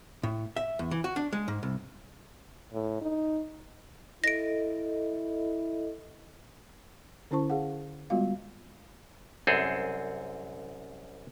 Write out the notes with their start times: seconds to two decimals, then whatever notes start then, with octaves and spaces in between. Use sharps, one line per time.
0.23 A2
0.56 E5
0.79 E2
0.91 E3
1.04 F#4
1.16 D4
1.33 G#3
1.48 G#2
1.63 C2
2.73 A2
3.01 D#4
4.24 E4 A4 D#5 A#6 D7
7.31 D3 C#4 E4 C5 A5 C#6
7.50 G#4 F5 F#5
8.10 G3 G#3 B3 F4 F#4 F5
9.47 C2 F#2 C4 G#4 A4